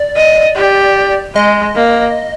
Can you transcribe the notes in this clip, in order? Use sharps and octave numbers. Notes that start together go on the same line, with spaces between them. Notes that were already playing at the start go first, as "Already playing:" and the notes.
Already playing: D5
D#5
G4
G#3 D#5
A#3